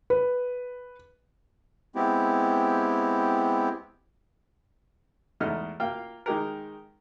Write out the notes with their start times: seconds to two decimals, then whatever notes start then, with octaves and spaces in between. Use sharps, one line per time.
0.10 B4
1.95 G#3 B3 C4 E4 G4
5.40 E2 G#2 A3 A4 D#5 F6
5.80 A#3 F4 F5 G5 F6
6.26 D#3 G#3 G4 A#4